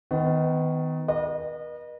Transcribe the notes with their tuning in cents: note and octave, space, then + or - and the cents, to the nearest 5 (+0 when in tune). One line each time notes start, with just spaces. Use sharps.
D#3 +15 B3 +30
B4 -45 D#5 -30